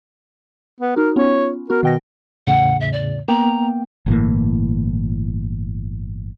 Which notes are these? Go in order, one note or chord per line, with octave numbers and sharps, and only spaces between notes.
B3
D#4 F#4 A#4
B3 C#4 F4 C#5
B3 F#4 A#4
B2 D#3 G5 A#6
E2 A2 C#3 F#5
E5
D5
A#3 B3 G5 A#5
G1 A2 E3 A#3